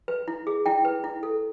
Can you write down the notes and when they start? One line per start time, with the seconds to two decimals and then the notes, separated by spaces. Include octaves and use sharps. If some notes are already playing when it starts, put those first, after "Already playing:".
0.08 B4
0.28 E4
0.47 G#4
0.66 E4 G5
0.85 B4
1.04 E4
1.23 A4